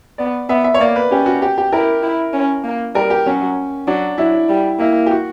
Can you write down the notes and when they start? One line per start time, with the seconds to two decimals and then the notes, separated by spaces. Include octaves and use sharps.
0.18 B3 D5
0.49 B3 E5
0.64 E5
0.74 C#5
0.81 A#3 D5
0.96 B4
1.11 C#4 G4
1.26 F#4
1.42 G4
1.58 G4
1.73 E4 A#4
2.03 E4
2.33 C#4
2.64 A#3
2.95 G3 A#4
3.10 G4
3.26 F#3 C#4
3.87 F#3 D4
4.18 F#3 E4
4.49 G3
4.79 A#3 E4
5.06 G4
5.11 F#4